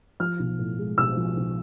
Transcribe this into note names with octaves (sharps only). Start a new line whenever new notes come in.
F3 F6
B1
A2
G#3
B1 E6
F3
B1